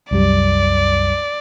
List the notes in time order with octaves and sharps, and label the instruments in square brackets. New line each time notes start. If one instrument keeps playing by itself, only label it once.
[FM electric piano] C2 F#2 G3 [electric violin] D5